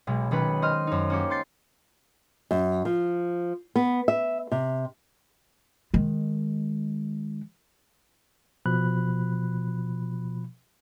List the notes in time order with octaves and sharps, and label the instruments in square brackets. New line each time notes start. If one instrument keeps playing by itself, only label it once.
[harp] B1 B2 G#3
B1 D#3 C#4 B4 B5
C5 D#5 C6 F6
F#2 D#4
A#3 C#4 G4
C6 G6 A6 C7
[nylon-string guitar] F#2
F3
B3
E5
C3
[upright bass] D#3 G#3
[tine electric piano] B2 F3 B5 F#6